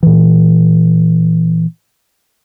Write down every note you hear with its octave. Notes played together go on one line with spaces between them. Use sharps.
A#2 E3